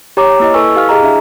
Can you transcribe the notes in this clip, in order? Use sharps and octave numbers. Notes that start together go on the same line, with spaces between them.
G4 C#5 A#5 D6
A#3 E4 D#5
E4 A4 B4 G#5 C#6 E6
G4 F5 F6
E4 G#4 D#5 A#5
D4 E5